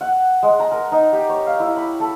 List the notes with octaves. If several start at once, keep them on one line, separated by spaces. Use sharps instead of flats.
F#5
G#3
A#5
A#4
D#4
G4
C#5
F5
E4
B5
A4